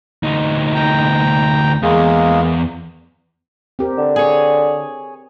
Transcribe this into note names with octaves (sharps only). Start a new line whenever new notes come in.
D2 D#4
G5 A#5
E2 G#3 A#3 G#4
C4 G4 A#4
D3
G#4 C#5